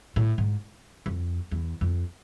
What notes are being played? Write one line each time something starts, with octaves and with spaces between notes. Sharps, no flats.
A2
G#2
F2
E2
F2